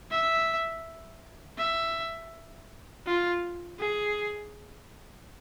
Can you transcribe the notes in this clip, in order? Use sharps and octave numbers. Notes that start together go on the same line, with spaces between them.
E5
E5
F4
G#4